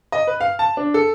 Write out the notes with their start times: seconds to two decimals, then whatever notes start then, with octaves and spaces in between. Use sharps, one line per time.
0.12 D#5
0.27 B4
0.41 F5
0.59 A5
0.77 D4
0.94 A4